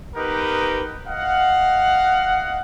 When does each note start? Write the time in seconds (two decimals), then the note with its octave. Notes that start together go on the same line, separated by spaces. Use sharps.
0.15 B3 D#4 G4 A#4 B4
1.08 D#5 F5 F#5